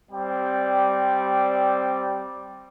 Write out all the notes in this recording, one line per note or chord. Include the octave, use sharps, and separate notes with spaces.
G3 C4 D5 G5